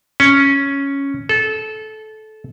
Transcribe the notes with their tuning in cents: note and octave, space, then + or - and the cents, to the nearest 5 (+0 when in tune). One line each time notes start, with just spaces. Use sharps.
C#4 +0
A4 -20